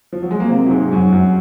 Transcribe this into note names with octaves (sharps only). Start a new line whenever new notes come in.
F3
F#3
G#3
A#3
C3 C4
F#3
G#2 G#3
F#2 F#3
F#2 F#3